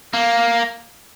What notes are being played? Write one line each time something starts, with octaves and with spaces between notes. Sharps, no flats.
A#3